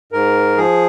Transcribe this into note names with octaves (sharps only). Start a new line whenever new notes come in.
G#2 A#4
F3 G#4